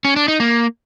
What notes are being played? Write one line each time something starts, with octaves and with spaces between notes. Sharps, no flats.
C#4
D4
D#4
A#3